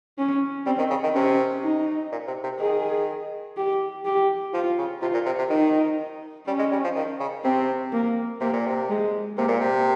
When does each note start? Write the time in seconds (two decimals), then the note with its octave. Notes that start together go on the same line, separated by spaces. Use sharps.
0.18 C#4
0.66 G3 C4
0.79 D#3
0.90 C#3
1.03 D#3
1.15 C3 C#4
1.63 D#4
2.12 A#2
2.28 C3
2.44 C3
2.60 D#3 G#4
3.57 G4
4.05 G4
4.54 F3 F4
4.78 C#3
5.02 C3 F4
5.14 A#2
5.26 C3
5.39 C3
5.50 D#3 D#4
6.47 G3 C#4
6.59 G#3
6.72 G3
6.84 F3
6.96 D#3
7.20 C#3
7.44 C3 C4
7.92 A#3
8.41 C3 A#3
8.53 A#2
8.66 C3
8.90 G#3
9.38 C3 A#3
9.48 A#2
9.60 C3